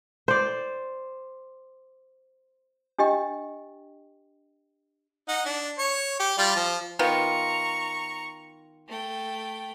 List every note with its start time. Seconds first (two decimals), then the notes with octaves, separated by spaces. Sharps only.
0.28 C5 D5
2.99 D4 G4 D#5 G5
5.28 D#4 F#5
5.45 D4
5.79 C#5 C#6
6.20 G4
6.38 G3 F4 D5
6.56 F3
6.99 D#3 B3 F4 A#5 C#6
8.88 A3 G5